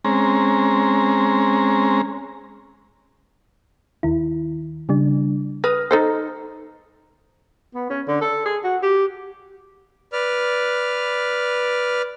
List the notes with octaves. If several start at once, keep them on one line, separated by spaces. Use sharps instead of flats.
G#3 C4 C#4 A#5
D#2 D#3 E4
C#3 G3 D4
B4 D#6 F6 A#6
D#4 A4 C5
B3
C#4
D3
A4
G#4
F#4
G4
B4 D5 F6